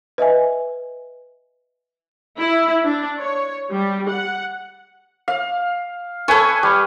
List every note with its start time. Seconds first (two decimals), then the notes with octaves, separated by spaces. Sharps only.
0.18 B4 D#5 E5 G#5
2.39 E4
2.84 D4
3.19 C#5
3.70 G3
4.08 F#5
5.28 F5
6.28 A4 B4 C#5 G#5 C#6
6.63 G3